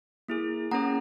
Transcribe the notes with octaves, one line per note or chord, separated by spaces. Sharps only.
A#3 E4 G#4
A#3 C#4 G#4 F#5 A#5